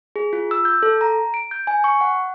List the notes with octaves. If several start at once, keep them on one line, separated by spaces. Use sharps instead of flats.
G#4
F4
E6
G6
A4
A#5
D7
G6
G#5
C#6
F#5